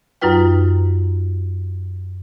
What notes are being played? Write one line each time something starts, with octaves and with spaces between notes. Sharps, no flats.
F#2 F#3 D#4 F4 B4 G5